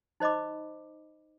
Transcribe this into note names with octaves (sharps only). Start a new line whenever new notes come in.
D#4 C5 D#5 B5 D6